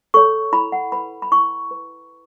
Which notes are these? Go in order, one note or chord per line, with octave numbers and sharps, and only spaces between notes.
A4 C#5 C#6
E4 B5
F#5
B4 B5
B5
E4 C#6
B4